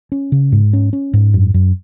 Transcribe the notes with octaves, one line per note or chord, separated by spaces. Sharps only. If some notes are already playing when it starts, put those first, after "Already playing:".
C#4
C#3
G#2
C#4
C#4
G#2
F#2
F#2